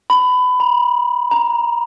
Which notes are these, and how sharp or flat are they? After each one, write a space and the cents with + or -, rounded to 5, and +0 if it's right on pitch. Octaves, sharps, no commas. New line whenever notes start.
B5 +25
B5 -40
A#5 +20